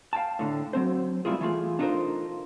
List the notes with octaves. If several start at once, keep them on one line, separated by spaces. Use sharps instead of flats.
F5 G5 A5
A2 D3
F#3 C4 C5
G3 A3 B3 E4 F4 G#4
E3 A3 F4 G#4
D4 D#4 F4 A4 A#4 C5